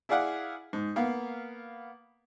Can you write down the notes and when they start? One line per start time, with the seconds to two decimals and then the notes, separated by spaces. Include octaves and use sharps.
0.09 E4 G#4 D5 F5 F#5
0.73 G#2
0.96 A#3 B3 F5